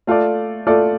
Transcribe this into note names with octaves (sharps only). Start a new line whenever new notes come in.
A3 F4 A4 D5
A3 F4 A4 D5